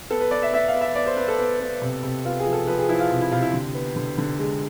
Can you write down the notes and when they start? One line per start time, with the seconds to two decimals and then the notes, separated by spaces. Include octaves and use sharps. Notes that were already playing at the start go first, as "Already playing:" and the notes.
0.10 B3 A4
0.20 B4
0.31 B3 D5
0.42 E5
0.53 B3 E5
0.68 F5
0.75 B3
0.81 E5
0.95 B3 D5
1.06 C5
1.17 B3 B4
1.28 A4
1.39 B3
1.60 B3
1.82 C3
2.03 C3
2.25 B3 F4
2.39 G#4
2.46 F3
2.53 A4
2.67 F3 B4
2.79 G#4
2.89 F3 E4
3.00 F4
3.10 C3
3.21 E4
3.32 C3 F4
3.42 E4
3.53 D3
3.75 B3
3.96 D3
4.18 D3
4.39 G#3